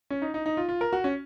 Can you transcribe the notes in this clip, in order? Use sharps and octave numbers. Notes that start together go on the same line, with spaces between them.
C#4
D#4
D#4
D#4
F4
F4
A#4
F#4
C#4